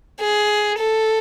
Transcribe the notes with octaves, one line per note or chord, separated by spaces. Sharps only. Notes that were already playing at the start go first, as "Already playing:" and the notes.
G#4
A4